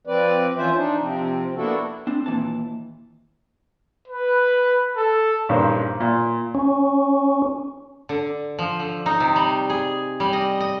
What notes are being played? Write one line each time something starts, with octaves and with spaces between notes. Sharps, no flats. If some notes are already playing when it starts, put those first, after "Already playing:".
F3 C4 B4 D5
E3 C#4 F4 C5 E5
D4 D#4
C3 F3 C4
A#3 B3 D4 E4 F#4 A4
C4 D4
D#2 A#2 E3 A5
B4
A4
A#1 G2 D#3 C#4 C5
A#2
C#4
D3
F3
D3
D#4
C3
G3
G#4
G3
D#5
D#5